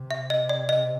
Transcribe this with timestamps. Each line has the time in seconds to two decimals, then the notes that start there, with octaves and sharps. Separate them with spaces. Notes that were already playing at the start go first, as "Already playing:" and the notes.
Already playing: C3
0.11 E5
0.30 D#5
0.49 D5
0.69 D#5